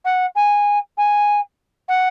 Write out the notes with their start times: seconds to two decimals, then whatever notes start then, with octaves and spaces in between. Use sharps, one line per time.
0.05 F#5
0.35 G#5
0.97 G#5
1.88 F#5